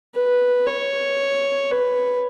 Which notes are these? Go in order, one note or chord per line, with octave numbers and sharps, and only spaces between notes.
B4
C#5
B4